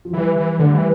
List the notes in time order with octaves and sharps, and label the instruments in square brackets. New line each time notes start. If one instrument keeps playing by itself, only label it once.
[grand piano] F3
[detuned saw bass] E3 [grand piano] G3
[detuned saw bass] E3
[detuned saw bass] D3 [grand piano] A3
[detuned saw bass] E3 [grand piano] G3